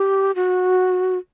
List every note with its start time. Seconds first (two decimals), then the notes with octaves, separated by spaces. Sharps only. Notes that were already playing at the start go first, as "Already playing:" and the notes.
Already playing: G4
0.36 F#4